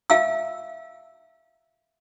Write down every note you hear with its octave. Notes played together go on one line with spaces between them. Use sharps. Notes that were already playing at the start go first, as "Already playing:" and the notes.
E5 F5 E6